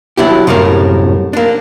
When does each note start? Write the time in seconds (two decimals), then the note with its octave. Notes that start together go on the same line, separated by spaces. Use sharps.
0.17 F#3 D4 E4 G4
0.47 C2 F#2 A2 A#3 A#4
1.33 A#3 D4